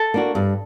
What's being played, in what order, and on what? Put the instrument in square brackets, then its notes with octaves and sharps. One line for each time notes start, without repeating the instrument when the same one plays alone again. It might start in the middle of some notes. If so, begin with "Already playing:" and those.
Already playing: [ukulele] A4
[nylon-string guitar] A#3 D4 F#4
G2